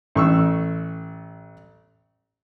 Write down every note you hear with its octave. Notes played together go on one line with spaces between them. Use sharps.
A1 C#6 E6